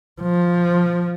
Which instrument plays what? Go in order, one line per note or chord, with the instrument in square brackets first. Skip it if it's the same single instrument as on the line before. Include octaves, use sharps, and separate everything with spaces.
[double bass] F3